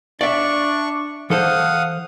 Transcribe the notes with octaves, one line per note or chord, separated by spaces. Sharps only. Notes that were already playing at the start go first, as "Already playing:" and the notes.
D4 D5 E5 C#6
E3 A4 C5 F5 F#5 D#6